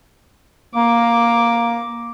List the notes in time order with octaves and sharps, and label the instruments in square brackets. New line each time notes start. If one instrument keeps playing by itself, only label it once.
[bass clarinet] A#3 [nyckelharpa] D6